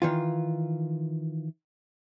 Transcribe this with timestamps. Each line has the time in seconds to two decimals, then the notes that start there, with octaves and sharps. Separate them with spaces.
0.02 D#3 E3 F4